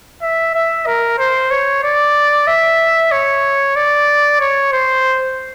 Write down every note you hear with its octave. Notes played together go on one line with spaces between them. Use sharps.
E5
E5
A#4
C5
C#5
D5
E5
C#5
D5
C#5
C5